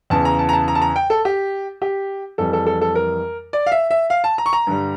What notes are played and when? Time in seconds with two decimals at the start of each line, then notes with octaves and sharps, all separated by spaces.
0.10 E2 C#3 E3 A5
0.25 A#5
0.39 A5
0.49 A#5
0.53 A5
0.68 A#5
0.75 A5
0.82 A#5
0.96 G5
1.10 A4
1.25 G4
1.82 G4
2.38 F2 E3 G3 A4
2.53 A4
2.66 A4
2.81 A4
2.95 A#4
3.53 D5
3.66 F5
3.72 E5
3.91 E5
4.10 F5
4.24 A5
4.38 A#5
4.46 C#6
4.53 A#5
4.67 G2 D3 G3